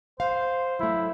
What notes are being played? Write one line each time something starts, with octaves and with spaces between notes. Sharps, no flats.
C5 F5
F#3 A3 E4